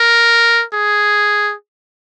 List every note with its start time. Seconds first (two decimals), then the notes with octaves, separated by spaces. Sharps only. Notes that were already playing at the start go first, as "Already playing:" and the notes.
Already playing: A#4
0.73 G#4